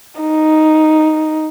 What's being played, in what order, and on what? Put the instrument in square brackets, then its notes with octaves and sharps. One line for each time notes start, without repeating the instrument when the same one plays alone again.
[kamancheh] D#4